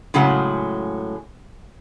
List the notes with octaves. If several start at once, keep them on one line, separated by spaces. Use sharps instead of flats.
A2 C#3 F#3 G#3 F#5